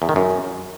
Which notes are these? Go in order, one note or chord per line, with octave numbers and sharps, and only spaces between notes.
E2
D#3
F#2